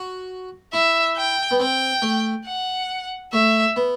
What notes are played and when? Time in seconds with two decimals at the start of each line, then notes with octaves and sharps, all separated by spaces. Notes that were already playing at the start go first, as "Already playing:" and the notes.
Already playing: F#4
0.73 E4 E5
1.16 G5
1.51 B3
1.60 C4 G5
2.02 A3
2.46 F#5
3.33 A3 E5
3.76 B3